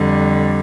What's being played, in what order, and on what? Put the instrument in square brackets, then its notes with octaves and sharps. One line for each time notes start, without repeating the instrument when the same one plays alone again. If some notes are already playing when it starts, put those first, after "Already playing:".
Already playing: [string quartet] F2 D3 G3